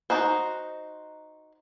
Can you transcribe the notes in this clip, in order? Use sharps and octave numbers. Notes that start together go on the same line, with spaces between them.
D#4 F#4 C5